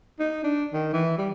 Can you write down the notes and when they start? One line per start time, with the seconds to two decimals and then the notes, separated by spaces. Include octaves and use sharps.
0.19 D#4
0.44 D4
0.73 D#3
0.93 E3
1.18 G3